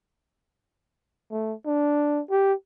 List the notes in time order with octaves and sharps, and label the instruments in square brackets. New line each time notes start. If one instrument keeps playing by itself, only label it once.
[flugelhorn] A3
D4
G4